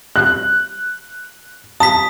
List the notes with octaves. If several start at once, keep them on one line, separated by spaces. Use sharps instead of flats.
F#6
A5 D#6 B6